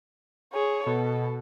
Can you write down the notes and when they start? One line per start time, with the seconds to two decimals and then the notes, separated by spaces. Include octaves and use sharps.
0.53 G#4 C#5
0.86 B2 A4